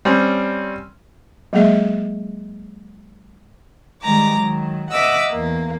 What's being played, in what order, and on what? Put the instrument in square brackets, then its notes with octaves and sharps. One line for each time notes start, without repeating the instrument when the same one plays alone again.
[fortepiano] G3 C4 C#4
[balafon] F#3 G#3 A#3 G#4 D#5 E5
[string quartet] D#3 G3 G#3 A#5 D6
D#3 F#3
D#5 E5 F#5 D6 E6
E2 A#3